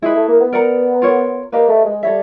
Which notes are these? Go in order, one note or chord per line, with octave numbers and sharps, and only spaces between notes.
G#3 E4 G#4 B4
A3
A#3
B3
A#4 D5 F#5 A#5
F4 A#4 C#5
A#3 G4 B4 D#5
A3
G#3
G3 A4 C#5 E5